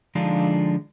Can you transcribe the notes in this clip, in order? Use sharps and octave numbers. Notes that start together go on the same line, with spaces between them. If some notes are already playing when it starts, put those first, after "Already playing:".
D3 F3 G#3 D4 D#4 F4